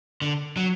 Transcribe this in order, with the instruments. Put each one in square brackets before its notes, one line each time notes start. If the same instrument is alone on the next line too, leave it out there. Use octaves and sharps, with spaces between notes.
[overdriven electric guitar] D3
F#3